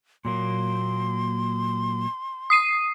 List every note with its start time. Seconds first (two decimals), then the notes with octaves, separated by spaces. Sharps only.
0.25 A#2 F#3 A#3 C6
2.50 D#6 C7 D#7